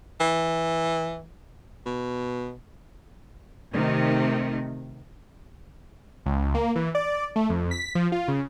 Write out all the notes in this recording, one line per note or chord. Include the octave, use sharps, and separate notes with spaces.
E3
B2
C3 D#3 A3
C#2
A#3
E3
D5
A3
F2
B6
F3
F4
C#3